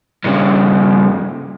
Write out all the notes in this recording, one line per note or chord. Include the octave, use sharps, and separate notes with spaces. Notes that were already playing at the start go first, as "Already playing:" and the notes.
G2 C#3